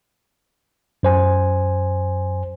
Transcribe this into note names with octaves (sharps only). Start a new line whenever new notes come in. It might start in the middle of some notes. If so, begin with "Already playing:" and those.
F#2 C5 G#5